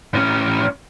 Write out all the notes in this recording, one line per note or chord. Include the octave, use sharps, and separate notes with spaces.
A2 C#4